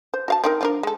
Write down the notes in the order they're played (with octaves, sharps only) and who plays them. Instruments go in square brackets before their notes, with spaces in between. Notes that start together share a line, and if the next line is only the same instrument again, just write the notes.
[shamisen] C5
F#4 F5 A5
C4 D#4 A#4
F3 D4 A#4
G#3 A4